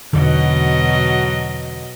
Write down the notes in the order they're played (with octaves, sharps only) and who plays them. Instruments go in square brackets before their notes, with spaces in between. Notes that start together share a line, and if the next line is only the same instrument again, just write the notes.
[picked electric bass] E2 D3 [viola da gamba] B2 F#3 D#5